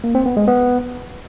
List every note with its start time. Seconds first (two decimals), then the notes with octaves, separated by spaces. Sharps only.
0.04 A#3
0.15 C4
0.26 B3
0.37 G#3
0.48 B3